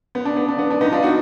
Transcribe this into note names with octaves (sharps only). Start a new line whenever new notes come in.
B3
D4
B3
D4
B3
D4
B3 D#4
D4 F4
D#4 F#4